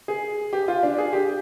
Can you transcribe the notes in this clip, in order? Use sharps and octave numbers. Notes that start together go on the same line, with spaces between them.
G#4
G4
F4
D4
G#4
G4